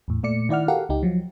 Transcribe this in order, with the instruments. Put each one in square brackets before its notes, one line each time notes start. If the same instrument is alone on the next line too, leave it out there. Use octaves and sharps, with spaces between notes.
[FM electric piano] E2 A2
A#2 A3 D5 C#7
D#3 E4 D5 F#5 F6
F#4 G4 A4 A#4 F5 F#5
C#2 D#4 G4
F3 F#3